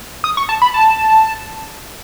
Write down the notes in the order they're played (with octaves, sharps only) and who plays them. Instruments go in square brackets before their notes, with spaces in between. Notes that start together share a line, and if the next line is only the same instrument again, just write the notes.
[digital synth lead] D#6
C#6
A5
B5
A5